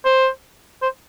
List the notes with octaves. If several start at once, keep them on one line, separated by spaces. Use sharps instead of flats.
C5
C5